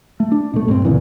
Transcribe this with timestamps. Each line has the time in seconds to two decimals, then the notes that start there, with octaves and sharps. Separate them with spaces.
0.20 A3
0.32 D4
0.54 B2 A3
0.68 G2 A#3 C4
0.85 D2 A#2 C#3 E3